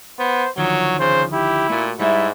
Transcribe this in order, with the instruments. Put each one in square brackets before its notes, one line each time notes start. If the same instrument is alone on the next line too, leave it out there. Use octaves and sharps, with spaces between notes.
[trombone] B3 [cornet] C5
[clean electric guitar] D2 D#3 F3 [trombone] F#3 [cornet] C#5
[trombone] C#3 [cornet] C5
[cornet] E4 [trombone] G4
[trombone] A#2 [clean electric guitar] A3 F#4
[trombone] G#2 [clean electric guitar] G3 E5 [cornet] E4